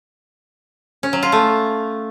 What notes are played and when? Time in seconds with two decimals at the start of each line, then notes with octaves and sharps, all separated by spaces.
1.03 C#4
1.13 F#3
1.23 F4
1.32 A3